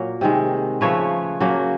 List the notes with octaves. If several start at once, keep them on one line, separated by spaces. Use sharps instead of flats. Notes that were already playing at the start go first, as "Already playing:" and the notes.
Already playing: A#2 F#3 A#3 A#4
C3 D#3 G#3
C#3 F3 A3 B4 C#5
C#3 F#3 A#3